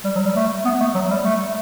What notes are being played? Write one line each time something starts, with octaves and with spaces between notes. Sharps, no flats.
G3
F#3
G3
A3
B3
A3
F#3
G3
A3